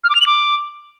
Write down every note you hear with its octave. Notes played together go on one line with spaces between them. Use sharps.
F6
D6
F7
F#7
D6